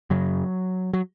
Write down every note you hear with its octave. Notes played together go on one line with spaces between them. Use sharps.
F#2 C#3 F#3
F#3